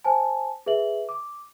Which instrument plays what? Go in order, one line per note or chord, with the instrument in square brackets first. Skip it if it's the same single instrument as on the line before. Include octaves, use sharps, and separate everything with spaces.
[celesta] C5 G#5 A5
G#4 B4 E5 F#7
D6